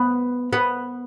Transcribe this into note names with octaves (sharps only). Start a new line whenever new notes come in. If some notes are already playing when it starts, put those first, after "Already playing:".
Already playing: B3
B3